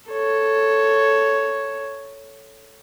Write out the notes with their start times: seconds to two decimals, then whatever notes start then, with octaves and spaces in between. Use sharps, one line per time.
0.10 A4 C#5